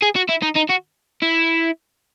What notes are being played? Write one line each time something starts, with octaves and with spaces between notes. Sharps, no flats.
G#4
F#4
E4
D#4
D#4
F#4
E4